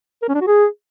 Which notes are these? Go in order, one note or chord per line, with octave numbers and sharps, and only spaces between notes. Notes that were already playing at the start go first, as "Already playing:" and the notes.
A#4
C#4
D4
F#4
G#4